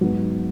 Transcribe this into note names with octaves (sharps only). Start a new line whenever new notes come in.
G#2 F#3 B3